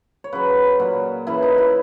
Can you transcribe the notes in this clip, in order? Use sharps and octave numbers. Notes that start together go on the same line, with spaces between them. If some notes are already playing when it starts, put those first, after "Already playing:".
C#5
C#3 F#3 B4
A#2 F#3
C#3 E3 E4
D#4
E4